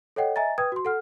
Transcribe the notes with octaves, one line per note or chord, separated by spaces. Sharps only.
A4 C#5 D#5 F#5 G5
D#5 E5 G#5 A#5 A6
B4 G5 D#6 G#6
F#4 C6
A4 F#5 F6